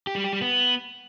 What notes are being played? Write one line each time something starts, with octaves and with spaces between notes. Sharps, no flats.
G4
G3
G4
G3
B3